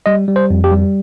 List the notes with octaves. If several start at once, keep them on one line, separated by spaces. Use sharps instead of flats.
G3 D#5
G3
C5
F2
G4
G3